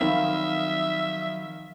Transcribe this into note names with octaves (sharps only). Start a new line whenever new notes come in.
D#3 F3 F#3 C4 E5 F5 B5 C6